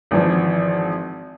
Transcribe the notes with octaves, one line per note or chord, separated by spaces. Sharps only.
G#1 E3 F3